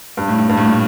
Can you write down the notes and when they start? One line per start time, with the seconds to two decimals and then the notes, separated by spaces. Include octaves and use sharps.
0.17 G2
0.28 A2
0.39 A2
0.49 G2
0.57 A2
0.65 A#2